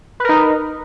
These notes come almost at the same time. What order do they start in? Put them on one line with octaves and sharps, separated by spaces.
B4 A#4 D#4